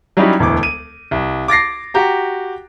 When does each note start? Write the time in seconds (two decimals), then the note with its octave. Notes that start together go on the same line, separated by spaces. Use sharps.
0.17 F#3 G3 C#4 D#4 E4 G4
0.39 E1 D2 E3 D6
0.63 D#7
1.11 C2
1.48 D6 A6 A#6 C7
1.94 F#4 G4 A#5